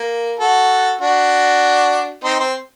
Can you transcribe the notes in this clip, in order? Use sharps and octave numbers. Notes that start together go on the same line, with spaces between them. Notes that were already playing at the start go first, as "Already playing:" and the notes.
Already playing: A#3
F#4 A4
D4 F#4
C4 D#4
C4